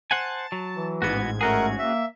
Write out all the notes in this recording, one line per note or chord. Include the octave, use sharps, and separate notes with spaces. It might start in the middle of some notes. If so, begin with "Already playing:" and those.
C5 F#5 G#5 A5
F#3
E3
A1 G#2 B3 F#4 G#6
A3 C#4 F#4 G#4 A#4 F#5
A#3 E5